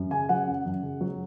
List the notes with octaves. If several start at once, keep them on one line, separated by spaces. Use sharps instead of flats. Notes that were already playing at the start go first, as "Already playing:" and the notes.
Already playing: F#2
C#3 G#5
F#3 F#5
F#2
F#2
C#3
F#3